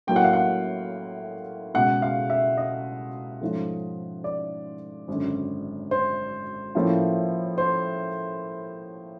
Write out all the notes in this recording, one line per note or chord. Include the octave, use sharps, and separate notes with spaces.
A2 F#3 A#3 G5
F#5
F5
F#5
C#2 B2 G#3 F#5
F5
E5
D#5
G#2 F3 A3 C#4 F4
D5
G#1 F#2 D3
C5
A2 F3 A#3 C#4 F4
C5